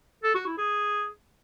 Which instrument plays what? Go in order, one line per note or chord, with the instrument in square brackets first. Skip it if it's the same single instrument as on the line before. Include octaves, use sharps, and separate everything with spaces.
[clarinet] A4
F#4
E4
G#4